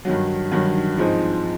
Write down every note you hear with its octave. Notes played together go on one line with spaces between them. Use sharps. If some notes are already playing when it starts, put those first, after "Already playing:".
G2 D#3 F#3
G2 D#3 F#3
G#2 F3 G#3 C4 D#4